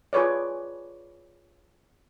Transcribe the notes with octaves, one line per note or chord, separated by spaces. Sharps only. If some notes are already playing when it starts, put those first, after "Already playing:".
F4 G#4 B4 C#5 D5